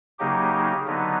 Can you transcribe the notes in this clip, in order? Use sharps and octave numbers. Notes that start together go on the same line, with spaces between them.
C#3 F#3 A#3 D#4 G4
D3 F#3 B3 D#4